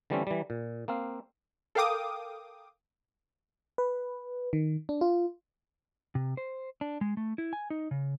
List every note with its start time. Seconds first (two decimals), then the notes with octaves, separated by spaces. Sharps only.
0.10 D3 E3 G3 A3 C4 C#4
0.27 E3 G3
0.50 A#2
0.88 A#3 C4 F5
1.75 A4 A#4 F5 G5 D6 D#6
3.78 B4
4.53 D#3
4.89 D4
5.01 F4
6.15 C3
6.37 C5
6.81 D4
7.01 G#3
7.17 A3
7.38 E4
7.53 G#5
7.70 D#4
7.91 C#3